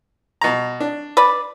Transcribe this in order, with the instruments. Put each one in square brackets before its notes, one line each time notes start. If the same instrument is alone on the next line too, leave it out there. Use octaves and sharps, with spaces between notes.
[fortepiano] B2 A#5
D4
[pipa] B4 D5